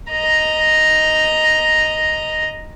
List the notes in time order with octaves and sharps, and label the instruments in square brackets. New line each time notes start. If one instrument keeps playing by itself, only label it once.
[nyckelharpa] D#5 A#5